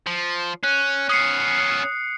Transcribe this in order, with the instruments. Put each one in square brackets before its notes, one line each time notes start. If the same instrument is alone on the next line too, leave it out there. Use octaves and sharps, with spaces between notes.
[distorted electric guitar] F3
[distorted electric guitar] C#4 [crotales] F#6
[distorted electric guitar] B3 C#4 [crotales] D#6 C7 C#7